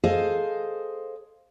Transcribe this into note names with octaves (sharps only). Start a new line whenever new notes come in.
G#4 A4 C5 D#5 F5